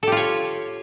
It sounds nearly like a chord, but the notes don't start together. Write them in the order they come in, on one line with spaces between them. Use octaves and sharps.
A4 G4 F4 C#5